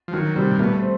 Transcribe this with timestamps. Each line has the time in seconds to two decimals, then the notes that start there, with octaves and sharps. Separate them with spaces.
0.08 F3
0.13 D#3 F#3
0.36 C3 G3
0.51 A#2
0.59 B2 A3
0.82 C4